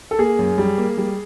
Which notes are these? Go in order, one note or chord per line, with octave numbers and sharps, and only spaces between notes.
A4
A#3 G#4
F#2
G3
A#3
G3